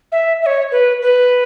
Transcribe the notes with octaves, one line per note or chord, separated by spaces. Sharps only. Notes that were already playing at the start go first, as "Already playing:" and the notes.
E5
E5
C#5
B4
B4